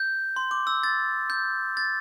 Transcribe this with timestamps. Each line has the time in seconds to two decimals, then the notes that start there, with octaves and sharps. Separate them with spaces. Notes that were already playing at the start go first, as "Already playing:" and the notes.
Already playing: G6
0.36 C6
0.51 D6
0.67 E6
0.83 A6
1.30 G6
1.77 A6